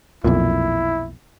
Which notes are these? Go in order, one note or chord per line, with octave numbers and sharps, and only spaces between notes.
B1 F2 A#2 E4